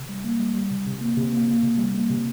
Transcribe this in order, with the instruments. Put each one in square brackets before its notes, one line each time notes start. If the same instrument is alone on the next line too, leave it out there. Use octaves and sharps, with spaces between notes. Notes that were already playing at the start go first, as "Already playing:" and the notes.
Already playing: [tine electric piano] C3
G3
A#3
G3
G3
C3
C3
A#3
C3
A#3
A#3
C3
G3
A#3
C3